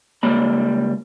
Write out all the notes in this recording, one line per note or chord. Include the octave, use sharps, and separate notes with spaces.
C#2 G3 A#3 B5